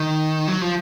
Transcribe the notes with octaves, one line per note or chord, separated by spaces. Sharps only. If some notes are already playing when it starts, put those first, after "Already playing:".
Already playing: D#3
F#3
F3